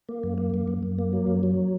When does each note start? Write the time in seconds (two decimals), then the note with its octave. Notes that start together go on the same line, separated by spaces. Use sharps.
0.09 A#3
0.23 F#2
0.38 A#3
0.54 F#2
0.68 F#2
0.83 F#2
0.98 A#3
1.13 F#3
1.27 F#2
1.43 F#3